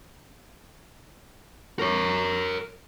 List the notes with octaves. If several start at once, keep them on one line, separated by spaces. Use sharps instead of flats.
A#4 C#5